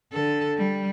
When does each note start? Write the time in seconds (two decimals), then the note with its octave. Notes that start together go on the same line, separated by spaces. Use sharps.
0.13 D3 A4
0.57 G3